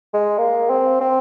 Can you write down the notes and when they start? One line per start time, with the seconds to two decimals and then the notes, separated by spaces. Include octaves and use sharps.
0.14 G#3
0.38 A#3
0.70 C4
1.01 C4